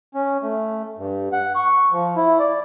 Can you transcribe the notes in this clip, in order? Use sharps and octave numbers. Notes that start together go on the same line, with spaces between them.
C#4
A3
G2
F#5
C#6
F3
E4
D5